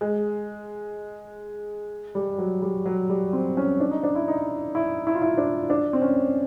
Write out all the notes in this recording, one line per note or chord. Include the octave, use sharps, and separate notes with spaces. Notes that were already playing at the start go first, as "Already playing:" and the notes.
G#3
G3
F#3
G3
F#3
G3
C4
C#4
D4
D#4
D4
E4
D#4
E4
E4
F4
E4
D4
D4
C4
C#4